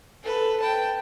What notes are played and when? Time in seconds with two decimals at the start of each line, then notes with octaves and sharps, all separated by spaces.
0.23 A4 B4
0.60 G5 A5